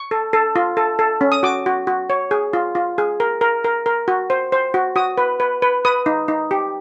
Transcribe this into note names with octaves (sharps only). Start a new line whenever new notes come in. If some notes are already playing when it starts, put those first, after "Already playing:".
Already playing: C#6
A4
A4
F4
A4
A4
C#4
D#6
F#4 D6
F#4
F#4
C#5
G#4
F4
F4
G#4
A#4
A#4
A#4
A#4
F#4
C5
C5
F#4
F#4 D#6
B4
B4
B4
B4 D#6
D#4
D#4
G4